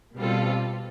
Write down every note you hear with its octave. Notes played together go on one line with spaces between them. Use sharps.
B2 G3 C4 F4 A4